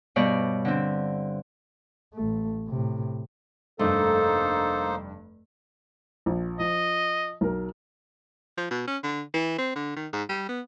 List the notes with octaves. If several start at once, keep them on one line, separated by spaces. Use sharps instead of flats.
G2 B2 C#5 D5
D3 C4
A1 A3
A2 C3
F1 G2 A3 A#3 D#4 A4 C5
A#1
F3 D#5
B1 A#4
F3
B2
C#4
D3
E3
C4
D3
D#3
G#2
G3
B3